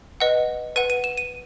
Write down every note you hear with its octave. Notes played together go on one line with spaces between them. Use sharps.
B4 D#5 F#5
B4 F#5 D#7
D#7
E7
D#7